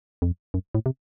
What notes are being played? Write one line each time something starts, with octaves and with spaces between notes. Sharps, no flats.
F2
F#2
A2
C3